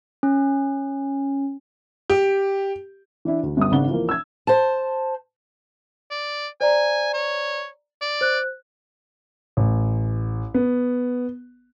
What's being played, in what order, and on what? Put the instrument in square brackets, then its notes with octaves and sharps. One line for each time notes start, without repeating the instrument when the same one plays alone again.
[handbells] C#4
[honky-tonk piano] G4
[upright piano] E3 D4 E4
D2
G1 G3 D#6
G#1 C#3 D4 F#5 G7
E3 F3 A#3
E6 G#6
[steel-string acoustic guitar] C5 A5
[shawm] D5
[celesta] C5 D5 A#5 [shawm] G#5
[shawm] C#5
D5
[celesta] C5 F#6
[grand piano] A1
B3